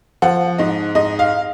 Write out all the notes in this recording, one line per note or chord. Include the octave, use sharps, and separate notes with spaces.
F3 F#5
G#2 D#5
G#2 D#5
F5